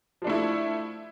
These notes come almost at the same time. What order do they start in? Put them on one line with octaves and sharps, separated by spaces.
F3 D4 A3 E4